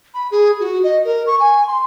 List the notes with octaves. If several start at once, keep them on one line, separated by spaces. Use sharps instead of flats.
B5
G#4
F#4
D#5
A#4
C#6
G#5
C6